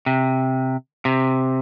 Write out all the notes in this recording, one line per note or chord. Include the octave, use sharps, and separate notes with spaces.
C3
C3